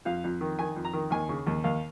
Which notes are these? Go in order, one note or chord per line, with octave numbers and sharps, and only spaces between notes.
F2 F5
F2
D#3
D#3 G#5
F2
A#5
D#3
D#2 G#5
C#3
D#2
D#2 F5